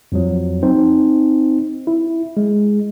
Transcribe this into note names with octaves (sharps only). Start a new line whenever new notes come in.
F2 F3 F#3
C4 D#4 C5
E4
G#3